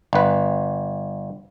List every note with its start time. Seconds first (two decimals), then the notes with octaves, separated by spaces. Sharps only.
0.13 G1 B4